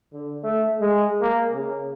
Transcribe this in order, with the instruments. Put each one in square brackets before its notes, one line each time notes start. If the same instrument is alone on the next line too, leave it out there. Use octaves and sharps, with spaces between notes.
[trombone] D3
A3
G#3
A#3
C#3